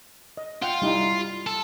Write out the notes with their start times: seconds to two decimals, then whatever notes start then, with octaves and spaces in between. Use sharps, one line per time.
0.37 D#5
0.62 F4 F#5 G5
0.82 G3 D#4 E4
1.47 A4